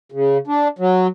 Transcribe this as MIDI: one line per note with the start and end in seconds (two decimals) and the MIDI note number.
0.12 0.38 49
0.47 0.68 62
0.79 1.07 54